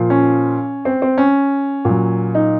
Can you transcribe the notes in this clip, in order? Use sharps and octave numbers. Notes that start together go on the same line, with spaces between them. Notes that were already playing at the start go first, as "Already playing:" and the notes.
Already playing: A#2 F3
C#4
C4
C4
C#4
A#2 F#3
D#4